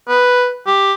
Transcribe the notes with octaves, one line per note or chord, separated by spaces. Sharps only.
B4
G4